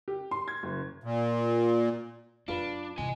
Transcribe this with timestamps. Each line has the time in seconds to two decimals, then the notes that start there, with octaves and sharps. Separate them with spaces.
0.08 G4
0.31 C6
0.48 G#6
0.63 F#1
1.04 A#2
2.48 F#2 D4 F4 B4
2.98 C2 E3 D#5 G#5